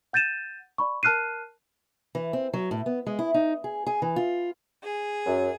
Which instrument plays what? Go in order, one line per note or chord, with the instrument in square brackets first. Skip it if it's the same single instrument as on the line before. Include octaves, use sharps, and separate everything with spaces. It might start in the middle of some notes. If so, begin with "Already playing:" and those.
[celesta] F#5 G6 A6 D#7 E7
D5 B5 C#6
A#4 A5 F6 F#6 C7 D#7
[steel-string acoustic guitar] E3
C4
F#3
A2
B3
G#3
E4
D#4
G#4
G#4
E3
F4
[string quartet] G#4
[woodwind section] F#2